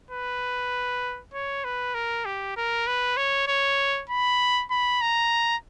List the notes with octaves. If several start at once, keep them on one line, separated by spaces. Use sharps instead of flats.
B4
C#5
B4
A#4
G4
A#4
B4
C#5
C#5
B5
B5
A#5